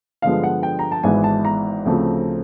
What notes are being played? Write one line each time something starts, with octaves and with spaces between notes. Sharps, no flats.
G2 D3 F3 G#3 B3 F5
F#5
G5
A#5
A5
G#1 G#2 E3 G#3 B3 G#5
A5
A#5
D2 C#3 F3 A3 C4